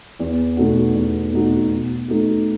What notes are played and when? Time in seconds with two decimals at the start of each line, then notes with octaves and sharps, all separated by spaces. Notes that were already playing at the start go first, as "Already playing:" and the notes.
0.19 E2
0.57 B2 A3 D#4 F#4
0.95 E2
1.33 B2 A3 D#4 F#4
1.70 B2
2.08 A3 D#4 F#4